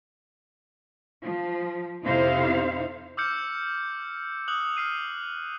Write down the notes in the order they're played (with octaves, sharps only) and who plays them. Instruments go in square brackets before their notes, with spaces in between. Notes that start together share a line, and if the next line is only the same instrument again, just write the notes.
[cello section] F3
F2 C3 D#4 E4 C5 F5
[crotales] D6 E6 F6 G6 C#7
D#6 F#6 F#7
F6 C7 D#7